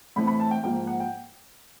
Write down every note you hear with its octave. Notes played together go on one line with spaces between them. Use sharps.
A2 E3 A3 C4 B5
B5
A5
G5
G#2 F3 A#3 G5
F#5
G5